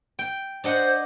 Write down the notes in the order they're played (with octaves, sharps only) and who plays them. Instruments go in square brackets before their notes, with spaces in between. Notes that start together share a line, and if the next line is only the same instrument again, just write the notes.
[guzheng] G5
[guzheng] D4 D#5 F#5 [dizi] C5